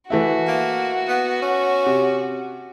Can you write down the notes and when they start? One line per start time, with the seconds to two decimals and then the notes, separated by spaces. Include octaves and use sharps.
0.10 E3 A3 E4 F#4
0.48 A#3
1.08 B3
1.42 C#4
1.86 C3